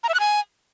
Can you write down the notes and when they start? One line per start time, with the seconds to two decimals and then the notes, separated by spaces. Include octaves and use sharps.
0.03 A#5
0.09 E5
0.14 F#6
0.20 G#5